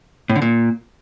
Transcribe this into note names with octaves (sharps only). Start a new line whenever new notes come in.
A2
D3
A#2